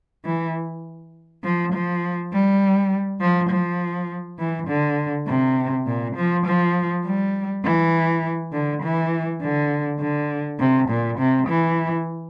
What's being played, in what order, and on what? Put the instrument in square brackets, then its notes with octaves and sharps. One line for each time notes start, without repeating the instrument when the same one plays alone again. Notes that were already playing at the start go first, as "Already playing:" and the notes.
[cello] E3
F3
F3
G3
F3
F3
E3
D3
C3
A#2
F3
F3
G3
E3
D3
E3
D3
D3
C3
A#2
C3
E3